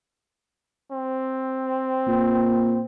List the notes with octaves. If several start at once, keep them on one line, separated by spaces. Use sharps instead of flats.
C4
A#2